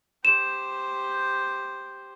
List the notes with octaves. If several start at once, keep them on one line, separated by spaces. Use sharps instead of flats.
G4 C5 E7